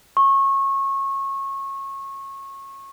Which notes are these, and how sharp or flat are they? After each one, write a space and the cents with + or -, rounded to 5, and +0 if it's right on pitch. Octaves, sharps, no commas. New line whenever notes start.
C#6 -25